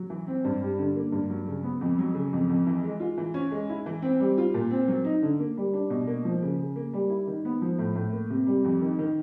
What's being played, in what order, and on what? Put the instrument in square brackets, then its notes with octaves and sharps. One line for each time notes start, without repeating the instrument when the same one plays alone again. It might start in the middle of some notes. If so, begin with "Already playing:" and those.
Already playing: [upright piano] F#3
E3
C4
G2
G3
D3
A#3
G2
F#3
C#3
B3
F2
F#3
C#3
F2
F2
E3
G#3
F4
E3
C#4
G#3
E4
E3
C4
G3
F4
A#2
C4
F#3
D#4
D3
A#3
G3
D4
B2
A#3
F3
C#3
C#3
A#3
G3
E4
D#3
B3
F3
A2
A2
A#3
C3
G3
F2
D#3
D#3